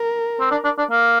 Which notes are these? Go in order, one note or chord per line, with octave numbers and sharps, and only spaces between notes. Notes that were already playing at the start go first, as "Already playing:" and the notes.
Already playing: A#4
C4
D4
D4
D4
A#3